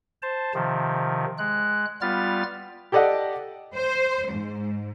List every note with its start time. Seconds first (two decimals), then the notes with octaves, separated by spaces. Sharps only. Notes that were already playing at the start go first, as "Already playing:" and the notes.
0.22 C5 A5
0.54 C3 D#3 F3
1.38 G#3 F#6
2.01 G3 B3 F4 F6 A6
2.92 G4 A4 D5 D#5 F#5
3.74 C5
4.31 G#2